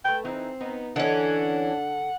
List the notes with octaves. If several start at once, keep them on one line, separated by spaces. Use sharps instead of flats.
A3 B4 G5
E3 C4 D#4 E4
B3 D#4
D3 E3 C#4 D4 A4 D#5 F#5